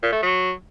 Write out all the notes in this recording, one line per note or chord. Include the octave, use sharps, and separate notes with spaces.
A#2
A3
F#3